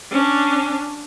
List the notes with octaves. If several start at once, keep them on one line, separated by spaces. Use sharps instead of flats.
C#4 D4